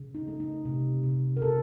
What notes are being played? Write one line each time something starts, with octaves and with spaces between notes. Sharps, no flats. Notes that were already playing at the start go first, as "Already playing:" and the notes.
Already playing: C#3
D#4
A3
D#4
C3
C3
A#4
C#3 A4